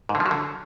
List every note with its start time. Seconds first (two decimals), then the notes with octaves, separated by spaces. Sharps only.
0.09 G#2
0.15 D3
0.20 F3
0.26 F#3
0.31 D3